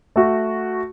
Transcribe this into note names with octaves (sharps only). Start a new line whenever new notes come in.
A3 F#4